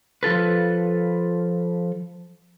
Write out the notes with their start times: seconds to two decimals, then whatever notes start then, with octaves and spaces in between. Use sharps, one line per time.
0.23 F3 F4 A4 B4